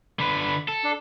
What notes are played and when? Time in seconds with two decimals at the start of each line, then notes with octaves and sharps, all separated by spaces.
0.20 D3 B4 B5
0.68 A4
0.84 D4